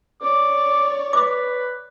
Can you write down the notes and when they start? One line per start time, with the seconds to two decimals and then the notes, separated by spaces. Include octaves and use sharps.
0.21 C#5 D5 D6
1.13 B4 D6